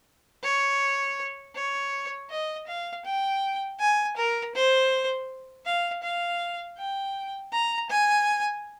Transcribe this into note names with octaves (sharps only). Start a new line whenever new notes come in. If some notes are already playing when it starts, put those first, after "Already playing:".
C#5
C#5
D#5
F5
G5
G#5
A#4
C5
F5
F5
G5
A#5
G#5